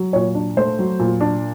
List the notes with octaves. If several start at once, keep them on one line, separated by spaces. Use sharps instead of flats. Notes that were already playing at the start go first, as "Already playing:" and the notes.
Already playing: F#3
A#2 C#5
D4
A3 C5
F#3
A#2
D4